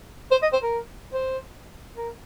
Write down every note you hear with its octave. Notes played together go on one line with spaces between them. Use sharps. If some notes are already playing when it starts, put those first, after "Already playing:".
C5
D#5
C5
A#4
C5
A#4